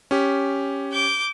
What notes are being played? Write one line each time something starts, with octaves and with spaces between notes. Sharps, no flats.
C#4 G4
D6 G6